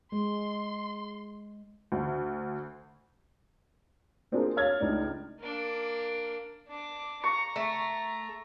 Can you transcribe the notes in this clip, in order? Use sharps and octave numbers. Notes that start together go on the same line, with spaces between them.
G#3 C6
D2
A#3 C4 D4 F4 G#4 A#4
C#5 F5 F6 G#6 A6
C#2 A3 D4 D#4 D5
A#3 D4
D4 D6
A#5 C#6
A3